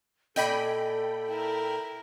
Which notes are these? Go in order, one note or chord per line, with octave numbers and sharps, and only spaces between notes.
A#2 A4 D#5 G5 G#5 B5
E4 A#4